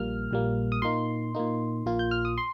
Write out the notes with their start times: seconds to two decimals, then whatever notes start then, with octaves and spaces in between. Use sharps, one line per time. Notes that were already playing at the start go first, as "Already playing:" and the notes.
Already playing: A#1 A#2 G3 A#3 F6
0.31 A#1 A#2 G3 A#3
0.72 D#6
0.82 A#2 A#3 D#4 C6
1.35 A#2 A#3 D#4
1.86 A#1 A#2 A#3 F4
1.99 G6
2.11 F6
2.25 D#6
2.38 C6